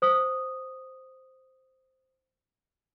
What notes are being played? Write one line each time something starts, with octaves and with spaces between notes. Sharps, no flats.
C5 D#6